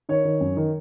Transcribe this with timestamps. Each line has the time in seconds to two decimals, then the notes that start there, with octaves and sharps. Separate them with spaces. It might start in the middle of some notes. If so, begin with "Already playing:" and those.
0.09 D#3 C#5
0.25 D#3
0.41 F#2
0.57 D#3